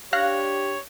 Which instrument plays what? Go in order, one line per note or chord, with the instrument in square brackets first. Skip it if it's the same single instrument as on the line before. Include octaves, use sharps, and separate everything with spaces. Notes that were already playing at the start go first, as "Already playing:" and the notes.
[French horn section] D4 G4 [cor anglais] C#5 [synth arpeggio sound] F5 F#6 A#6